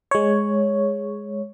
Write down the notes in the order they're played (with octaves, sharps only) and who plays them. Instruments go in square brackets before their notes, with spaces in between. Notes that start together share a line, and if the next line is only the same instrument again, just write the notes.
[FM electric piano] G#3 C#5